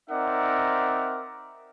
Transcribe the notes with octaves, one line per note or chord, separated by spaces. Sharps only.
C4 D#4 A#4 D5 E5 F#5